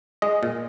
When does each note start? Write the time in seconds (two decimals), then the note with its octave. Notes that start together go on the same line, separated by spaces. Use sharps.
0.22 G#3 D#5
0.43 A#2